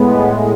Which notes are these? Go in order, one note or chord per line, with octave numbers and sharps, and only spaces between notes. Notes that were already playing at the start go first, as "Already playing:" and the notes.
Already playing: A2 G#3 B3